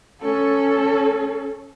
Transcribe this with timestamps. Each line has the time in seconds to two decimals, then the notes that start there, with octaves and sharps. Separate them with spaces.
0.22 C#4 A4